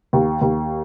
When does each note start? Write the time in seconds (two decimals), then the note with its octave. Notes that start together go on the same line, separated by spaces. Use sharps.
0.13 D#2
0.41 D#2